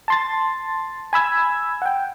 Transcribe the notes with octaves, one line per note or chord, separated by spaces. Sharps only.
A5 C6 A6
G#5 B5 E6 G#6
F#5 G5